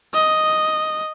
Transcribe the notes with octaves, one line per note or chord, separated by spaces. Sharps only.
D#5